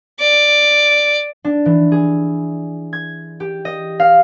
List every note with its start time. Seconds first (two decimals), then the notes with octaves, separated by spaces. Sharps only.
0.20 D5
1.44 D4
1.65 E3
1.92 G#4
2.93 G#6
3.40 G4
3.65 D#5
4.00 F5